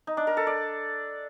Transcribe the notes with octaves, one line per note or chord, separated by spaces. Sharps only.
D#4
D4
A#4
A4
D5